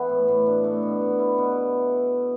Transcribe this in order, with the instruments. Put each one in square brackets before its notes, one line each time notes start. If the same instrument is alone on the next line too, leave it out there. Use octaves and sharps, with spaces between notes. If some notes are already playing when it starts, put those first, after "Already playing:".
Already playing: [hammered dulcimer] E3 B3
A2
A2
D4
A3
B2
B2
E4
B2